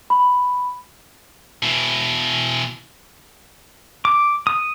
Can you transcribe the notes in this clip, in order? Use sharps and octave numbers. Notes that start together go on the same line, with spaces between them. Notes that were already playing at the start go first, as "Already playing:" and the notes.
B5
B2 E3
D6
D#6